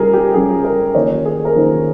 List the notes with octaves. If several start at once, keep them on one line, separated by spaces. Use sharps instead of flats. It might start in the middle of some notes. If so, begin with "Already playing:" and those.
Already playing: C#3 G3 C#4 F4 G#4 A#4
G4
C#3 G3 C#4 F4 G#4
A#4
D#3 A#3 C#4 F4 C#5
G#4
A#4
D#3 A#3 C#4 F4 C5